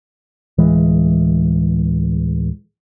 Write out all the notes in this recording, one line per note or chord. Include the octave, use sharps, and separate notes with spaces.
D1 E3 G#3